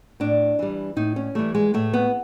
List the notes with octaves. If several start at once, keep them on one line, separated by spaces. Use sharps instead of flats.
A2 D4
E3 G3
A2 D#4
C#4
E3 G3 A3
G#3
A2 A3
B3